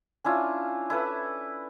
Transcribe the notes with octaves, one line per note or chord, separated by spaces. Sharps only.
C#4 D4 E4 F4
E4 A4 B4